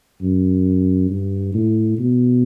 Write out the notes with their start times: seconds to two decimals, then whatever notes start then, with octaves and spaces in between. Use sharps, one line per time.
0.21 F#2
1.09 G2
1.54 A2
1.99 B2